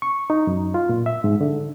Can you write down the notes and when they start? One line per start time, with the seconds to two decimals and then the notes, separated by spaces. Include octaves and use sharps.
0.02 C#6
0.30 D#4
0.47 F#2
0.74 F4
0.89 A#2
1.06 E5
1.24 G#2
1.41 D3